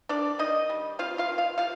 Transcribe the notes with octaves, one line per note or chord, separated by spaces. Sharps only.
D#3 D4 D5
D#3 D#4 D#5
G3
C4 F4 F5
F4 F5
D#3
F4 F5
C3 F4 F5